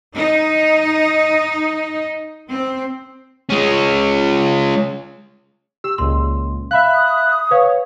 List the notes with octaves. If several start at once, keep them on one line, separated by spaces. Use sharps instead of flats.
D#4
C4
G#3 C#4
G4 E6
C#2 A#2 C6
E5 F5 B5 F#6
D#6
B4 C#5 F5